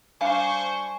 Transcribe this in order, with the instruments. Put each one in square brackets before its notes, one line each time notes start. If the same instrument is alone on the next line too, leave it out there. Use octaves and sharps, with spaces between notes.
[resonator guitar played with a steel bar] G3 D4 F5 [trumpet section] C5 C#6 [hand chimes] G#5